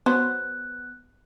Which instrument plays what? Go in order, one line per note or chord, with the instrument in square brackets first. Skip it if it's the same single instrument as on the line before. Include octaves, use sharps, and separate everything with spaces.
[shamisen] F#3 C5 [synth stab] B3 [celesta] F#6